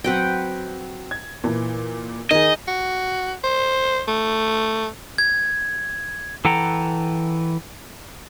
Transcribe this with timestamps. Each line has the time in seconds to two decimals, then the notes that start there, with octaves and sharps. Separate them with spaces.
0.04 F#3 C4 B4 F#5 G5
1.11 G#6
1.44 A#2 E3
2.31 D#3 D#4 G#4 D#5
2.68 F#4
3.44 C5
4.08 A3
5.18 G#6
6.45 E3 A4 F#5 G5 A#5